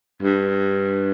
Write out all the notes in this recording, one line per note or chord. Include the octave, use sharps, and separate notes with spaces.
G2